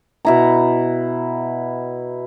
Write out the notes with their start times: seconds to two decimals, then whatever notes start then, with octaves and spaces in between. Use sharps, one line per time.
0.25 B2 E4 A#5